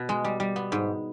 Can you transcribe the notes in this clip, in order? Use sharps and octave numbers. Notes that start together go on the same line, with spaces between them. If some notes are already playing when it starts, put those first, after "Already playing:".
Already playing: B2 B3
G#3
G3
G3
B3
G#2